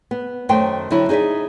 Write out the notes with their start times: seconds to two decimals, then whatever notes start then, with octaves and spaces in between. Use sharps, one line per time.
0.11 B3
0.49 F#2 D#3 A3 C5 G5
0.91 D3 F#3 E4
1.09 D#4 G#4 C#5 D5 E5